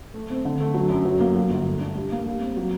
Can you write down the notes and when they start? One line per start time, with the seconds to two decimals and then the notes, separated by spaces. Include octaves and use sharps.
0.14 A3
0.30 C4
0.45 D3
0.60 A3
0.74 F#3
0.90 F#2
1.05 F#3
1.20 A#3
1.36 F#3
1.50 G1
1.66 A3
1.81 D4
1.95 G3
2.12 A#3
2.26 G3
2.41 C4
2.57 F#3